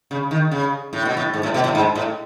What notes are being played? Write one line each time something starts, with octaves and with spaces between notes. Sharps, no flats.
C#3
D#3
C#3
A2
B2
A2
G#2
A2
B2
A2
G#2
A2